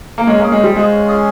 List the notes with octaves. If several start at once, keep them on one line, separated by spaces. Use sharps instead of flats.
A#3
G#3 C#4
A#3 G#4
G#3
G3 C5
G#3 F4
C#4
G#4